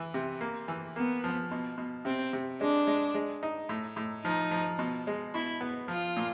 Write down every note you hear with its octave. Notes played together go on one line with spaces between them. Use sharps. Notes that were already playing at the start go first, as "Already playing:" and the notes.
Already playing: E3
C3
A#3
E3
A#3 B3
F3
B2
B2
C3 C4
C3
G#3 D4
G#3
G#3
D#4
A2
A2
F3 D#4
F3
B2
G#3
B2 E4
B3
F3 F4
A#2